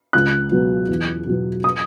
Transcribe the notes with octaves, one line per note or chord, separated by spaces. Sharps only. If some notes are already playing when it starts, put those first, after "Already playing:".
C#2 F#6
B2 F#3 B3
E2
B2 F#3 B3
D#6